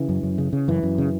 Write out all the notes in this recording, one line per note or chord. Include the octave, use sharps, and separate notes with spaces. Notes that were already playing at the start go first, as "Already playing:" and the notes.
Already playing: C#3 E3
F#2
F#2
C#3
C#3
F#2 E3
F#2
C#3